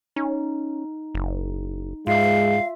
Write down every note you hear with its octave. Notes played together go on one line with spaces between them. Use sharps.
C#4 D#4
F#1
G#2 G#3 F4 E5 F5